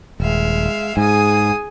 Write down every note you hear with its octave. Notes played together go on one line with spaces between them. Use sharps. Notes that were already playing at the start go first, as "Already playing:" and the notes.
D#1 G#3 E5 F5
G#2 G#4 G#5 D#6